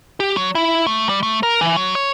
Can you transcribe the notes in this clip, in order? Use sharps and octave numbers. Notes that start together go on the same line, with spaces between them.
G4
F#3
E4
A3
G3
A3
A#4
E3
F#3
C#5